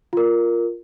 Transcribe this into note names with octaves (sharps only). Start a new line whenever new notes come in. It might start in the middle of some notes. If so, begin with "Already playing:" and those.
F4 A#4